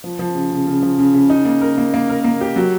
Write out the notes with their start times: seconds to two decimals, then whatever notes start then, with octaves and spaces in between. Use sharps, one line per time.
0.04 F3
0.19 F3
0.35 C#3
0.51 C#3
0.67 C#3
0.83 F3
0.98 C#3
1.14 C#3
1.30 D#4
1.45 A#3
1.61 A#4
1.78 A#3
1.94 A#3
2.09 A#4
2.24 A#3
2.41 G4
2.56 F#3